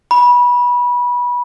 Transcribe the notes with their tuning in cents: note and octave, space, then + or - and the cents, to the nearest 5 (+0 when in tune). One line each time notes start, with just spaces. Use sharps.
B5 -20